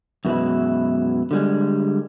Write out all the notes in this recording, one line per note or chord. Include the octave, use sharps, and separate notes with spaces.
F#2 B2 E3 G#3 E4
D3 G3 G#3